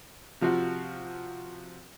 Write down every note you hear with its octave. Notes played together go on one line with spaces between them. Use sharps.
C3 F3 F4 F#4